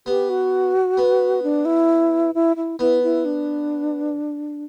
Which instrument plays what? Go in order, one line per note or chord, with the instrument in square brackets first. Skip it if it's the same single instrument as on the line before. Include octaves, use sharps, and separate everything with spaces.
[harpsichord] B3 [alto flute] G4
[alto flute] F#4
[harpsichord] B3
[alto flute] D4
E4
E4
E4
[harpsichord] B3 [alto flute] E4
[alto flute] E4
D4